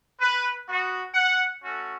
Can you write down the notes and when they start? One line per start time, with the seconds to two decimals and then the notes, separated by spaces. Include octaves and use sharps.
0.20 B4
0.68 B3 F#4
1.14 F#5
1.62 A3 C#4 F#4